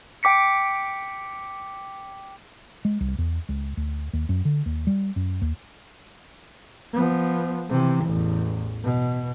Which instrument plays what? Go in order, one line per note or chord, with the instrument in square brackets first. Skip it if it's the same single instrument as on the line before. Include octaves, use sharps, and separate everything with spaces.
[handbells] G5 D6 B6 C#7
[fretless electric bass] G#3
C2
E2
C#2
D2
D#2
F#2
D3
D#2
G3
F#2
D#2
[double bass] F3 B3
C3 E3
A1 E2
B2